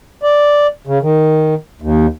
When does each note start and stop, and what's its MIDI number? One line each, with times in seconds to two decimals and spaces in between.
0.23 0.67 74
0.87 0.99 49
1.03 1.54 51
1.82 2.06 39